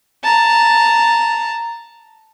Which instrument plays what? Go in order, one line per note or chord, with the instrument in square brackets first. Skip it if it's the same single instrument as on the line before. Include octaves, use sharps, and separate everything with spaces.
[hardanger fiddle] A5 A#5